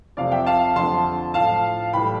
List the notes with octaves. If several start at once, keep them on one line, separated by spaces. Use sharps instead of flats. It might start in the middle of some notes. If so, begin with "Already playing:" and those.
F2 C3 F3 D5 F5
E5 G5
F5 A5
F2 D3 F3 A5 C6
A2 F3 F5 A5
A2 E3 G3 G5 B5